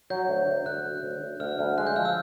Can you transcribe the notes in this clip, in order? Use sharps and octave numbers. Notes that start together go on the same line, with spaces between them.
F#3 G6
D2
D2
D2 F#6
F#3
D2
D2
D2 F6
D2
G#3 F#6
G6
F3 F6
E6